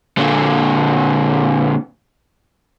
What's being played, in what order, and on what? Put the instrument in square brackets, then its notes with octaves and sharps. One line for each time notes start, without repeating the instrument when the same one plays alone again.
[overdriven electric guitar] A#2 D3